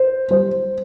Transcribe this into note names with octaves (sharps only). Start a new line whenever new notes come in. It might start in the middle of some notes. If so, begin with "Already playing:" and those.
Already playing: C5
G3 C5